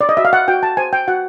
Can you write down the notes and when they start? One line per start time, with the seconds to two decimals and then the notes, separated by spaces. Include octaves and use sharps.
0.01 D5
0.09 D#5
0.17 F#4 E5
0.25 F5
0.33 F#5
0.48 F#4 G5
0.63 A5
0.77 C5 G#5
0.93 G5
1.08 F#4 F#5